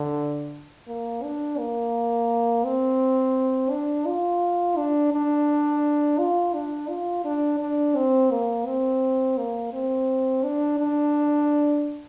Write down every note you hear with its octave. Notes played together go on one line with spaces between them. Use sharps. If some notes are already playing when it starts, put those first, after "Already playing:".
Already playing: D3
A#3
D4
A#3
C4
D4
F4
D4
D4
F4
D4
F4
D4
D4
C4
A#3
C4
A#3
C4
D4
D4